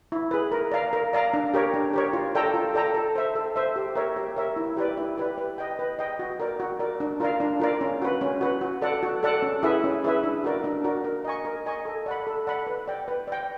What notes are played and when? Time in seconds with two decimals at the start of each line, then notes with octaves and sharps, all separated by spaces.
0.12 E4
0.31 G#4 B4
0.52 A#4
0.72 D5 F5 A#5
0.93 A#4
1.13 D5 F5 A#5
1.34 D4
1.54 G4 A#4 C#5
1.74 D4
1.93 G4 A#4 C#5
2.13 F4
2.35 A4 D5 G5 A#5
2.54 F4
2.74 A4 D5 G5 A#5
2.94 A4
3.16 C5 E5
3.35 A4
3.56 C5 E5
3.76 G4
3.96 A#4 C#5 E5
4.16 G4
4.36 A#4 C#5 E5
4.56 E4
4.77 G4 B4 D5
4.97 E4
5.18 G4 B4 D5
5.38 B4
5.58 D#5 G5
5.79 B4
5.99 D#5 G5
6.19 F#4
6.40 A#4 D5
6.60 F#4
6.80 A#4 D5
7.00 D4
7.20 F4 A#4 D5 F5
7.40 D4
7.60 F4 A#4 D5 F5
7.81 C#4
8.02 F#4 B4
8.21 C#4
8.41 F#4 B4
8.61 F#4
8.82 A4 D5 F#5
9.03 F#4
9.23 A4 D5 F#5
9.42 C#4
9.63 E4 G#4 B4 E5
9.84 C#4
10.04 E4 G#4 B4 E5
10.24 D4
10.44 F#4 A#4 D5
10.64 D4
10.84 F#4 A#4 D5
11.04 A#4
11.25 D#5 G#5 C#6
11.45 A#4
11.66 D#5 G#5 C#6
11.85 A4
12.06 D5 F#5 B5
12.27 A4
12.47 D5 F#5 B5
12.67 B4
12.88 D5 G5
13.08 B4
13.28 D5 G5